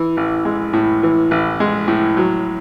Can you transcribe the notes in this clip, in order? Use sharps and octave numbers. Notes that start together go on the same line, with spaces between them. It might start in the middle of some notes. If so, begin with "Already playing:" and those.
Already playing: E3
A1
G#3
A2
E3
A1
G#3
A2
F#3